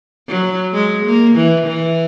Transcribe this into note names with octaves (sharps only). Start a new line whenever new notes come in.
F#3
G#3
A#3
E3
E3